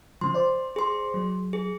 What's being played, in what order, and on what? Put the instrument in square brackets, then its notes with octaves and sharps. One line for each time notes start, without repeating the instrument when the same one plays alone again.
[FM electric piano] C#3 F3 [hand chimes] C6
[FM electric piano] C5 D5
[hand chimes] G#4 C6
[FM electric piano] F#3
[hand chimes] G#4